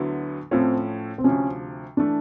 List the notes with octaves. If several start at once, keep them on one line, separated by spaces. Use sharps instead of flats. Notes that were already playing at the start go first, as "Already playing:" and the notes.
Already playing: D2 D3 F#3 B3 E4
A2 F3 A3 C4 C#4 F4
C4
D2 C3 F3 C#4
E3 A3 D4